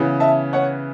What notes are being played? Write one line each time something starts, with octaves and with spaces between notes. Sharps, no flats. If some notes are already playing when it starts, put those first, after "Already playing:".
Already playing: C#3 E3 B3
E5 A5
C#5 F#5